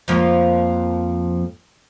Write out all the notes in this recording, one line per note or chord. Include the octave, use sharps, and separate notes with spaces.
F2 F3 A#3